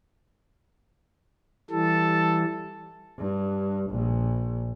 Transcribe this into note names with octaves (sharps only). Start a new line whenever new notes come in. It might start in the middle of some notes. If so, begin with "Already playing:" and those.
E3 G3 A4
G2
A#1